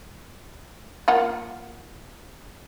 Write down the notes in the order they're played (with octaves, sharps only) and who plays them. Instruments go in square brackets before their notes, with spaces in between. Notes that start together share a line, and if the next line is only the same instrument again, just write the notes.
[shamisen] A#3 F4 F#5